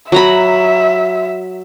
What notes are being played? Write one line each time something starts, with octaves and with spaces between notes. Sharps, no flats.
F#3 E5 A#5 B5